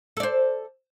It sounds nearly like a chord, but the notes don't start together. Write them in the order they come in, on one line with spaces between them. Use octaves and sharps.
A4 D5 C5